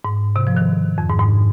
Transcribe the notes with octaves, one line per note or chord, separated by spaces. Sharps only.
G#2
C3
F3
D#3
F2
G#2
G#2